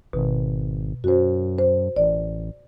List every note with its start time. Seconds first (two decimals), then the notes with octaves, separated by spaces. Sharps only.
0.13 G#1 B2
1.04 F#2 F#4 C5
1.59 C5
1.96 A1 D5